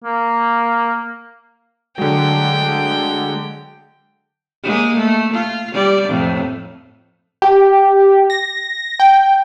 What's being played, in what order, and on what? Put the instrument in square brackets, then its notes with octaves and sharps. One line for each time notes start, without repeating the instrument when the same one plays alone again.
[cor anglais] A#3
[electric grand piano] D3 F#3 [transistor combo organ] G#3 [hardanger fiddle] G5
[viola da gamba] G#3 A#3
A3
F4
G3 D5
F2 A2
[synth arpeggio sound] G4
A#6
G5